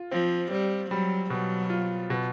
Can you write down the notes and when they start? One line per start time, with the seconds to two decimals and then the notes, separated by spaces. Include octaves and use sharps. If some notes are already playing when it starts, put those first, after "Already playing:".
Already playing: F4
0.11 F3 C4
0.51 G3 C4
0.90 F#3 G3
1.30 B2 F#3
1.70 F4
2.10 B2